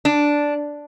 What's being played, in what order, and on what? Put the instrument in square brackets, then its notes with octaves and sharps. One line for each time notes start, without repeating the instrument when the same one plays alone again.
[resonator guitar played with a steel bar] D4